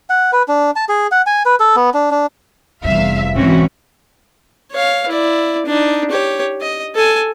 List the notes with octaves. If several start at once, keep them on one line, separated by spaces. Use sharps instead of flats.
F#5
B4
D4
A5
G#4
F#5
G#5
B4
A4
B3
D4
D4
F1 E2 G3 E5 F5
B1 G#2 E3 C4 C#4 F#4
C#5 F5
E4 D5
D4 D#4
G4 C#5
D#5
A4 G#5